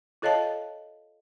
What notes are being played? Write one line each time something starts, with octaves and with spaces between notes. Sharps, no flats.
F4 A4 C#5 D#5 F5 A5